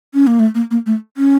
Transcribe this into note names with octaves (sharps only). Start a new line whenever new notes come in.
C#4
A#3
A3
A#3
A#3
A3
C#4